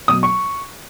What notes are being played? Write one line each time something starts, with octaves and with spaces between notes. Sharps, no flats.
B2 F#3 D#6
C#6